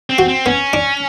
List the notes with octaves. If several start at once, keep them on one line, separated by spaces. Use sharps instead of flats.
C4
F#4
C4
B3 C#4
D4